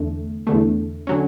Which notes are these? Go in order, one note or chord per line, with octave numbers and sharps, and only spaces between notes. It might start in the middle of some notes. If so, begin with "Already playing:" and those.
Already playing: E2 D3 A3
E2 D3 A3
D3 F#3 C#4